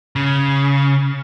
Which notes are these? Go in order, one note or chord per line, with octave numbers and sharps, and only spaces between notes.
C#3